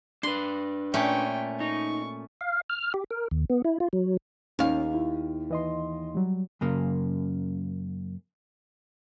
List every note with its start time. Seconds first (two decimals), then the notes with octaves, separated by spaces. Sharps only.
0.23 D4 B4 C6
0.94 A#2 A3 C#4 G5
1.60 D#4 C#6
2.41 F5
2.70 F6
2.94 G4
3.11 A#4
3.31 D#2
3.50 B3
3.64 E4
3.80 F4
3.93 F#3
4.59 D#2 C#4 F5
4.94 E4
5.50 E3 D#5 C6
6.15 F#3 G3
6.61 F#2 C#3 A#3